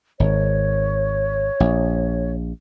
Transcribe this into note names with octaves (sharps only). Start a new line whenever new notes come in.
G#1 C#5
A#1